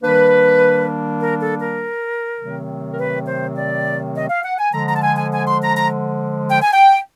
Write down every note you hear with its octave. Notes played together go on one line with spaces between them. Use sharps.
D#3 G3 A#3 D4 B4
A#4
A4
A#4
C3 D#3 F#3 A3 C4
A#4
B4
C5
D5
D#5
F5
F#5
G#5
D3 F3 G#3 A#5
A#5
A5
G#5
G#5
G#5
C6
A#5
A#5
G5
G#5
G5